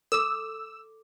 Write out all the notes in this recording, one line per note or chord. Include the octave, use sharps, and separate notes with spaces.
A4 D6 E6